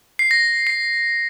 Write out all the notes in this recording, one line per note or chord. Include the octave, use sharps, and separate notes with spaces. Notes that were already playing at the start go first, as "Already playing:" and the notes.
C7
A#6
C7